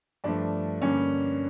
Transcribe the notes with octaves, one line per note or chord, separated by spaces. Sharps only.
G2 F3 A3 D4
G2 D3 G3 A#3 C#4